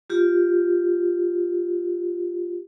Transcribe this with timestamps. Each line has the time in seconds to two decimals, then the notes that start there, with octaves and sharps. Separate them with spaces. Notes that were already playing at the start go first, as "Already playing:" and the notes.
0.10 F4 G4